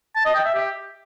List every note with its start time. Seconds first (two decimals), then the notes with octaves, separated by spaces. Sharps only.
0.16 A5
0.25 D#5
0.35 G5
0.45 E5
0.55 G4